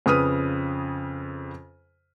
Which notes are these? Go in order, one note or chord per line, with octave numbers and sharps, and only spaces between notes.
F2 C#3 B4 D#6 F6 D#7